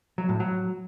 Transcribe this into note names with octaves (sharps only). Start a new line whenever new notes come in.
F#3
A2
F#3